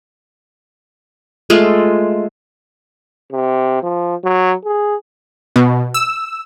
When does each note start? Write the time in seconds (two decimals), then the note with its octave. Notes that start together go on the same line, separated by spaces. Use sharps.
1.50 G#3 A3 F4
3.32 C3
3.83 F3
4.24 F#3
4.65 G#4
5.56 B2
5.94 E6